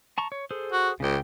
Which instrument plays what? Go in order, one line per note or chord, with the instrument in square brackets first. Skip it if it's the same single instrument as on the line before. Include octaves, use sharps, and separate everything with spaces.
[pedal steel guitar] A5 A#5 C#6
C#5
G#4 A4 C5
[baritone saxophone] F#4
[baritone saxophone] C#2 [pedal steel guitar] C#3 G5